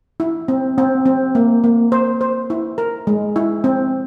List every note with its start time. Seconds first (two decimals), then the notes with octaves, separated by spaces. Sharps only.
0.20 E4
0.48 C4
0.78 C4
1.06 C4
1.35 A#3
1.64 A#3
1.92 C5
2.21 C5
2.50 E4
2.78 A#4
3.07 G#3
3.36 E4
3.64 C4